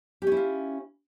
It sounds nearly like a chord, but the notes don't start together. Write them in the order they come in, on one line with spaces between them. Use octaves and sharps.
G4 C#4 E4 F4